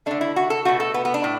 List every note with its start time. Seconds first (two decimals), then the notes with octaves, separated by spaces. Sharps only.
0.06 D3 A3 D4
0.21 E4
0.36 F#4
0.50 A4
0.65 B2 A3 F#4
0.80 A4
0.94 B3
1.05 B3
1.14 D4
1.24 A2